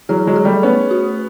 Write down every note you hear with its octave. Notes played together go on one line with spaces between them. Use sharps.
E3 F#3 G#4
F#3 G#3
G#4
G3 A3
A3 B3 C#4
F#4